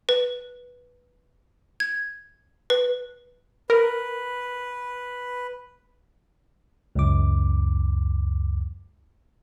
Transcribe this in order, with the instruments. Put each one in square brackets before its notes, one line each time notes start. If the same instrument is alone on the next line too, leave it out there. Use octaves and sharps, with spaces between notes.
[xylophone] B4
G#6
B4
[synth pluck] A#4 [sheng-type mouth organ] B4
[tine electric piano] C#2 F#2 D6